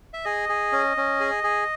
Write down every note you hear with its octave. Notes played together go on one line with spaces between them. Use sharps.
E5
G#4 D#5
G#4
C#4
C#4
G#4
G#4